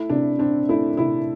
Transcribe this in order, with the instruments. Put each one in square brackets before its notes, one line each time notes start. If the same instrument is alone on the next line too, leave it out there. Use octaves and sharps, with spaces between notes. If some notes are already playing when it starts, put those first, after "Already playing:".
Already playing: [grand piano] A3 E4
C3 D4
C4 D4
A3 E4
C3 E4